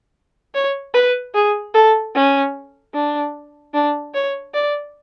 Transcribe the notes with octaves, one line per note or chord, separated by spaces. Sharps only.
C#5
B4
G#4
A4
C#4
D4
D4
C#5
D5